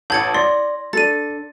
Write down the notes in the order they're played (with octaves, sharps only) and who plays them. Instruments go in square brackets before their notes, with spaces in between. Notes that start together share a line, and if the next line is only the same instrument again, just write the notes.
[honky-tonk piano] A1 A5 F#7 [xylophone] G6 G#6 C#7
[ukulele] D5 [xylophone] C6 [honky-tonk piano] A#6
[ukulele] D4 A4 [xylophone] A6 D#7